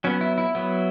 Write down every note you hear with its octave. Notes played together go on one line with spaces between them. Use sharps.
F#3 B3 C#4
E4
E4
F#3 B3